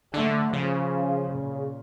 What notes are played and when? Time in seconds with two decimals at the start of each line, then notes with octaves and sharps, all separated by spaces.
0.13 D3 A3
0.53 C#3 F3
1.32 A#2